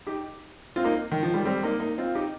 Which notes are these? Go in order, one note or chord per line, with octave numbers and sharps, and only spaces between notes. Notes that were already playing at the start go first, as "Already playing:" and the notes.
D#4 G4
C4 F4
A#3 D#4
D#3
F3
D#3 G3
G3 C4
A#3 D#4
A#3 D#4
C4 F4
D#4 G4